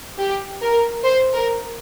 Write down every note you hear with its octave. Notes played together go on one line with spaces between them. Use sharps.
G4
A#4
C5
A#4